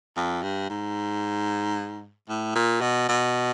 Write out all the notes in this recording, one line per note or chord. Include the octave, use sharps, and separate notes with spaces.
F2
G2
G#2
A2
A#2
B2
B2